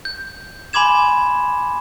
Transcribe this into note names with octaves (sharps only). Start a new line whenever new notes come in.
G6
G#5 B5 C6 D6 G#6 E7